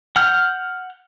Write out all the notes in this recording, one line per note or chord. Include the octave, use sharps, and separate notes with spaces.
F#5 F6 G6